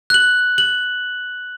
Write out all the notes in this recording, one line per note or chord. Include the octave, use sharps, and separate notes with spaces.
F#6 F#7
F#7